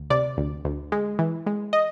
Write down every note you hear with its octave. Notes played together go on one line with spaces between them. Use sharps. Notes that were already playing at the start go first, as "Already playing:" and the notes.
Already playing: D2
C3 D5
D2
D2
G#3
E3
G#3
D#5